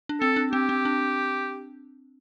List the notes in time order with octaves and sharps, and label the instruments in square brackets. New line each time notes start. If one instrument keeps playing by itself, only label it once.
[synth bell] D4
[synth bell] C4 [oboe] A4
[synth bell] D4
[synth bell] C4 [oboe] G4
[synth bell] C4
D4